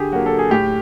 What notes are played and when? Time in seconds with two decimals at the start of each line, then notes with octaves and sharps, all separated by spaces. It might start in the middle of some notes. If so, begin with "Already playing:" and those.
Already playing: D3 G4 G#4
0.12 F#3 A#3 F#4
0.26 A4
0.39 G#4
0.50 A2 G4